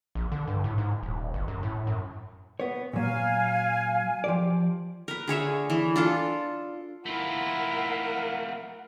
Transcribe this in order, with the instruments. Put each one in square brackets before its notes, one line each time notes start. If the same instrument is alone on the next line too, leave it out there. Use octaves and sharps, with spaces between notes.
[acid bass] A#1
D3
G2
A2
G#2
D#1
G1
F#2
A2
F#2
[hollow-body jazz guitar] B3 C#5
[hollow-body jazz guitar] A#2 F#3 [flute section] F5 G#5
[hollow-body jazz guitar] F3 G4 D5
[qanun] A#4 B4
D3 G#4 C#5 E5
E3
D4 F4 A4
[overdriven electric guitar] A3 F4 [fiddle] E4 [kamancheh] A#4 F#5